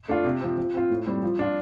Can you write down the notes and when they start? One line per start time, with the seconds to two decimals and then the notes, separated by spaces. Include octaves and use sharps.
0.08 A3 D4 F4
0.24 C3
0.41 F3 C4
0.58 F3
0.74 C4 F4
0.90 A2
1.07 G3 C4
1.23 F3
1.39 D4 F4